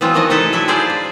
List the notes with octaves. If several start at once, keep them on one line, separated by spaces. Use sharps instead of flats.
E3 F#3 B3 C4 F4
D#3 F#3 D4 F#4 D#5 G#5
C3 D#4 E4 A4 B4 A5
F#3 D4 E4 E5
F4 G#4 C5 D5
D4